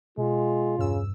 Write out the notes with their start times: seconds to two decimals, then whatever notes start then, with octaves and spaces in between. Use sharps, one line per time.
0.18 B2 G#3 F4
0.78 E2 G2 C#3 E6